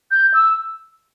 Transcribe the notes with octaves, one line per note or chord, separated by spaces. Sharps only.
G6
E6